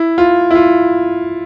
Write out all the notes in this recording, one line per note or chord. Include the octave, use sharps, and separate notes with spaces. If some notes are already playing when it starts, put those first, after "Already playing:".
Already playing: E4
F4
E4
F4